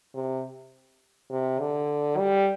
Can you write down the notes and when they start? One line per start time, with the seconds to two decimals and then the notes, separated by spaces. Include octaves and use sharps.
0.14 C3
1.31 C3
1.60 D3
2.18 G3